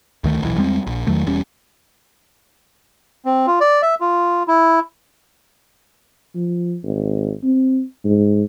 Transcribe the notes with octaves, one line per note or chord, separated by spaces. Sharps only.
D2 D#3 A3
D#1 B1 E3
E2 G3 G#3 C4
A#1
E2 D#3 F#3 A3
E1 E2 G3 C#4
C4
F4
D5
E5
F4
E4
F3
G#1
C4
G#2